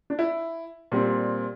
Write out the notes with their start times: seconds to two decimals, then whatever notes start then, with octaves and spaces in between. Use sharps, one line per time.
0.10 D4
0.19 E4
0.92 A#2 G3 C4